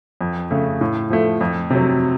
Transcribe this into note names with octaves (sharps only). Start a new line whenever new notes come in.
F2
C#3 A3
A2
F3 A3
F2
C3 F#3